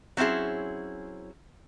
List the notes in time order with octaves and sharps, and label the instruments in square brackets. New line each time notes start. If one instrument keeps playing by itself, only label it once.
[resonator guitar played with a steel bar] F#3 C4 C#4 E4 G#4